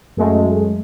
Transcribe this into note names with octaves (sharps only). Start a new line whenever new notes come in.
F#2 G#3 A3